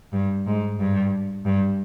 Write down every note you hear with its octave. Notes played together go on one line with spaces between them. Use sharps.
G2
G#2
G2
G2